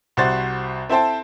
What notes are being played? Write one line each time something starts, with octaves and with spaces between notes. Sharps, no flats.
C2 F#4 C5 A6
C4 E4 A4 C5 G5 A5